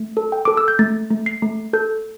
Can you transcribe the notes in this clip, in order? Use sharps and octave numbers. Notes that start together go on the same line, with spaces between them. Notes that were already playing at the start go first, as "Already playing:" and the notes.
Already playing: A3
A4
G5
A4 D6
E6
G6
A3 A6
A3
C7
A3
A4 G6